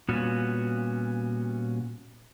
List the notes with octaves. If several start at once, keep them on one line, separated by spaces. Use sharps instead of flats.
A#2 G3 B3 C#4 F#4